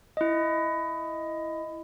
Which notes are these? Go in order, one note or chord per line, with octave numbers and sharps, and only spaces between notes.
E4 D#5